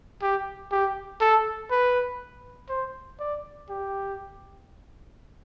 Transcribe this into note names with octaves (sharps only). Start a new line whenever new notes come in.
G4
G4
A4
B4
C5
D5
G4